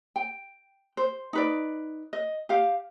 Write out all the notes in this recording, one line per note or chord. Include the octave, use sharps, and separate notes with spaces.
G5
C5
D#4 B4 D5
D#5
G4 F5